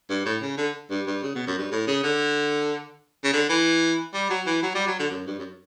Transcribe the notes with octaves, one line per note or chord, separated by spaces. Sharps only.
G2
A2
C#3
D3
G2
G2
C#3
B2
F#2
G2
A2
C#3
D3
C#3
D3
E3
G3
F#3
E3
F#3
G3
F#3
D3
F#2
G2
F#2